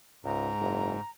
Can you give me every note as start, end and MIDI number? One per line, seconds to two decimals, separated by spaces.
0.25 0.51 37
0.25 1.00 44
0.25 1.10 82
0.60 0.94 30